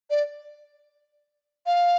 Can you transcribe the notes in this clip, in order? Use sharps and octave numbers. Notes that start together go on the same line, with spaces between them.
D5
F5